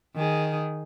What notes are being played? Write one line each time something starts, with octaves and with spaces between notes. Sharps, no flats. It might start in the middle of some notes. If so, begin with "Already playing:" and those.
D#3 G#4